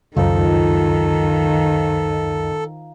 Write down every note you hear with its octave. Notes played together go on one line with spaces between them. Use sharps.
C#2 F#2 D#3 F3 D#4 A4